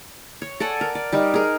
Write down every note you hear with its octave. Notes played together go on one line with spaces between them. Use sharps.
C#5
A4 D5 F#5 G#5
A#4
D5
G3 D#4 A#4
G#4 A#4